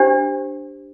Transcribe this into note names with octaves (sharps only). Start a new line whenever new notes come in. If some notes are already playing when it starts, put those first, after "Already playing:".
Already playing: D4 G4 C5